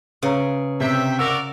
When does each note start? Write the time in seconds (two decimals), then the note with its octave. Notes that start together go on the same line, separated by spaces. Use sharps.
0.22 C#3 B4 C#5 A#5
0.80 C3 E5 G5
1.19 F#4 A#4 D5 E6